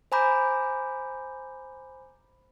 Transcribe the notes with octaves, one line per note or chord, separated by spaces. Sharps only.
C5 G#5 A#5 B5 D6 G6